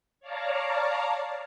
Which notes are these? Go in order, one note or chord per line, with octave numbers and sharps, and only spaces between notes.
C#5 D5 F5 A5 A#5